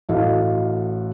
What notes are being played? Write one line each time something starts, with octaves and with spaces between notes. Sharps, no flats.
A1 E4 F#4 A4 D#5 F5